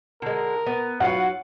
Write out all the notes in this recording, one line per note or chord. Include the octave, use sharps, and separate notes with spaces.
D3 G#3 A#4
B3
F#3 F4 B4 F#5